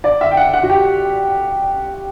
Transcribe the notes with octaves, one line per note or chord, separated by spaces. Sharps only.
D5
E5
G5
F#5
F#5
F#4
G4